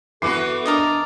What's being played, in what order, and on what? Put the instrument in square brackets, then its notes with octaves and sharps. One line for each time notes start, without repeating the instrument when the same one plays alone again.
[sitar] E3 F#4 B4 [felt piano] B3 D6 C7 [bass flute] A4
[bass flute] D4 [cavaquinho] A#4 D5 D#5